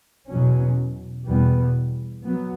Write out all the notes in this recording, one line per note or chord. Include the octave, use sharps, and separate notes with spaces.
E2 B2 F#3 C#4
E2 B2 G3 B3
F#3 B3